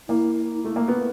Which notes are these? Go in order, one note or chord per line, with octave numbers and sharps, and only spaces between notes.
A#3 E4
A3
A#3
B3